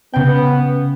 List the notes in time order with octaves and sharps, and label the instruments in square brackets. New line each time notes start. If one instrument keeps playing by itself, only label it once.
[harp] C#3 G5 [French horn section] B3